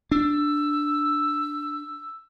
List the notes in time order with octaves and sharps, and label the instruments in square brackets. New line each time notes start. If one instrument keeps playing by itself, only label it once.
[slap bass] D4 [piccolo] E6